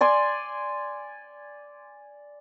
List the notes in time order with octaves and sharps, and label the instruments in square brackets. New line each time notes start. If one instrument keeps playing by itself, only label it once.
[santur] D5 G#5 C6